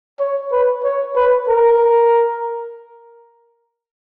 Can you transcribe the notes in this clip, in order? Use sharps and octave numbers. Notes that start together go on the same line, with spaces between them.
C#5
B4
C#5
B4
A#4